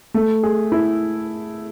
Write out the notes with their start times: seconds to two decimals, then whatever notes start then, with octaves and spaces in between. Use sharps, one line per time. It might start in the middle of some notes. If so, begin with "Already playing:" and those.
0.14 A3
0.43 G#4
0.72 E4